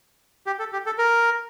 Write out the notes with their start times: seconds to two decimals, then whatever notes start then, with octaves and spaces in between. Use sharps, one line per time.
0.47 G4
0.59 A4
0.73 G4
0.86 A4
0.98 A#4